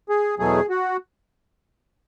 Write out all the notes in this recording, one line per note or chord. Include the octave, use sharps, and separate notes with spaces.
G#4
E2 B2 F#3 A3 G#4
F#4